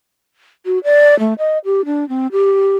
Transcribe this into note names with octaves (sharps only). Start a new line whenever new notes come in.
F#4
D5
A3
D#5
G4
D4
C4
G4